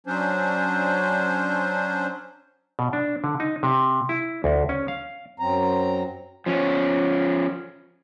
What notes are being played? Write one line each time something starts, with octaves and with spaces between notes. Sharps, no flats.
F#3 C#4 D4 C5
B2
D4
D3
D#4
C3
E4
D2
C#4
F5
F#2 F#3 C4 A#5
F3 C#4